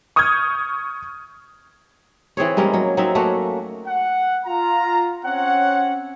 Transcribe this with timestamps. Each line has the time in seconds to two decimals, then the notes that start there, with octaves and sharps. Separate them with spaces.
0.16 C#6 D#6 F6 G6 G#6
2.37 E3 C4 G#4 C#5
2.57 G3 G#3 A#3 C#4
2.73 F#3
2.97 F#3 C4 D#4 E5
3.15 A3 A#3 C#4 F#4
3.87 F#5
4.46 F4 A#5
5.26 C4 C#4 C#5 F#5